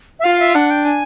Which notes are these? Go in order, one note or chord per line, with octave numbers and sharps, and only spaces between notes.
E5
F4 F5
E5
D4 F#5
G5
G#5